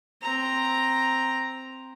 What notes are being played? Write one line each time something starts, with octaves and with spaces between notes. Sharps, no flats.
C4 A#5